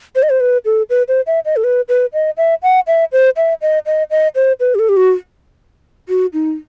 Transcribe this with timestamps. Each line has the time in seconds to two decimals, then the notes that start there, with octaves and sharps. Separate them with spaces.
0.16 C5
0.23 D#5
0.30 C5
0.40 B4
0.65 A4
0.90 B4
1.08 C5
1.27 E5
1.45 D#5
1.56 A4
1.64 B4
1.89 B4
2.13 D#5
2.37 E5
2.63 F#5
2.87 E5
3.12 C5
3.37 E5
3.62 D#5
3.86 D#5
4.11 D#5
4.35 C5
4.60 B4
4.75 G4
4.79 A4
4.89 G4
4.97 F#4
6.09 F#4
6.33 D#4